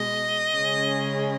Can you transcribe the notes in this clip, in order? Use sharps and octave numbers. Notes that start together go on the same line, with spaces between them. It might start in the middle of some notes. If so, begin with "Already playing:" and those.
Already playing: B2 G#3 D#5
C#3 G#3 C#4 G#4